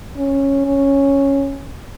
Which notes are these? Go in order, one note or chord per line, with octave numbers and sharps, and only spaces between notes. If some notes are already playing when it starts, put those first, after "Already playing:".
C#4
C#4